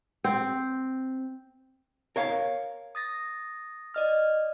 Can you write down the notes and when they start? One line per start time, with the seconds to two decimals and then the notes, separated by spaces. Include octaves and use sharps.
0.24 C4
2.16 A#4 C#5 F5
2.95 D#6 A6 A#6
3.94 D5 D#5 F6